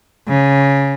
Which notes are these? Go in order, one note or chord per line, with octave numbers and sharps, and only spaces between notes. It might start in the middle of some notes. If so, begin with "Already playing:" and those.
C#3